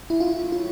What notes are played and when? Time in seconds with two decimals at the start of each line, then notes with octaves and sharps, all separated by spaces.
0.10 E4
0.20 F#3 A3 C#4 E4 F4
0.52 F4